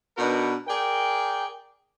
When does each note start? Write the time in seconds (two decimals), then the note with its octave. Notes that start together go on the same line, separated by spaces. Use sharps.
0.18 B2 D4 D#4 F#4 A#4 B4
0.68 G#4 A#4 D5 G5